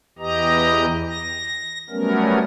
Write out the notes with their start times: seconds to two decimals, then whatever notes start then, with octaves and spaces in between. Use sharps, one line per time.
0.19 E2 E3 G4 D#5 A#5
1.08 A#6
1.90 F#3 G3 A3 B3 C#4 A#4